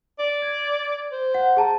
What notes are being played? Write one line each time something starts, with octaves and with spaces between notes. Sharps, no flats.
D5
G#6
C5
F#5
G#4 A5 A#5